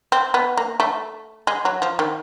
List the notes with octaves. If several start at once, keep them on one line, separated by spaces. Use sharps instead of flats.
C4
B3
A#3
A3
G#3
F#3
F3
D#3